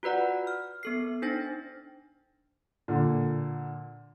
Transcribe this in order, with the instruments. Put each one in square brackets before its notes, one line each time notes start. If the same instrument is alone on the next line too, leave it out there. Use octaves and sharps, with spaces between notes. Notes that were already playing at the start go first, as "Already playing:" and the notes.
[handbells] F4 F#4 B4 D5 F#5
F6
B3 A4 C7
D4 D#4 C5 A#6
[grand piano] A#2 D3